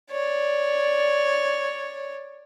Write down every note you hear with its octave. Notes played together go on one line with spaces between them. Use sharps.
C#5 D5